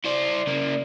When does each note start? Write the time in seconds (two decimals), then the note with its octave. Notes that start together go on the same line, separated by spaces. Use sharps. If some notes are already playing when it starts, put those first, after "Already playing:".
0.05 E4 C5 D5
0.47 C#3 A#3